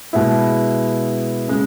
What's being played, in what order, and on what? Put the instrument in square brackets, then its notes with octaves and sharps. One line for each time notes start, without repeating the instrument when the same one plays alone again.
[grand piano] B2 G#3 B3 E4
C#3 G#3